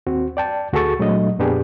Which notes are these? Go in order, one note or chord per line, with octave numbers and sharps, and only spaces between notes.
D#2 C4 F#4
D5 G5 A5
D2 F#4 G#4 A4 C#6 A6
A#2 F#3 G#3 A3 D4 D#5
F2 A#2 B3 D4 G4 G#4